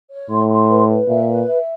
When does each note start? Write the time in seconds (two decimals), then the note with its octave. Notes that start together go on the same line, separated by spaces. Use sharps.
0.11 C#5
0.30 A2 C6
0.49 C6
0.69 B4
0.88 B4
1.08 A#2 E5
1.28 B4
1.48 E5